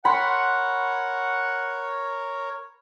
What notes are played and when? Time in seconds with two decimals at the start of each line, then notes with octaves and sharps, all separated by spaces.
0.05 A#4 C#5 F#5 B5 C6